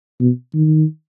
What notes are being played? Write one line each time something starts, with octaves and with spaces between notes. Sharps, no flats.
B2
D#3